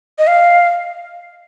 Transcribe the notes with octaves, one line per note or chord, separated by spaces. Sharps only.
D#5
F5